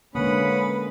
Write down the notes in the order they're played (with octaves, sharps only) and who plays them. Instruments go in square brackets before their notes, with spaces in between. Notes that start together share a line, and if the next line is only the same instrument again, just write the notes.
[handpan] D3 A#3 [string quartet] G#3 B4 [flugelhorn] C#4 [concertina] F#5 B5 D#6